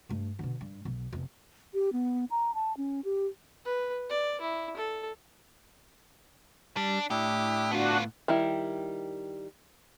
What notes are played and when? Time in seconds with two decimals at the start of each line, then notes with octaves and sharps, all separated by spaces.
0.09 G2 A3
0.39 B2 D3
0.61 G2
0.85 B1 B2
1.13 F1 E2
1.74 G4
1.93 B3
2.31 A#5
2.54 A5
2.77 C#4
3.04 G4
3.65 B4
4.10 D5
4.41 E4
4.77 A4
6.77 G3 D4
7.10 A2 D4 E4 G4 D#6
7.72 B3 D4 F4 F#4
8.28 D#3 G3 E4